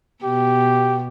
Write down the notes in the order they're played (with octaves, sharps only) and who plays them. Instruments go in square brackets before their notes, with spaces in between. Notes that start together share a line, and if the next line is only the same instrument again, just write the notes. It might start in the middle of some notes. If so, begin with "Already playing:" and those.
[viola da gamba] B2 [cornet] G4